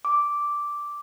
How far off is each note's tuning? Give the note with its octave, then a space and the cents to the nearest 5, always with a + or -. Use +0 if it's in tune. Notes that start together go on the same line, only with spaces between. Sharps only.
D6 -5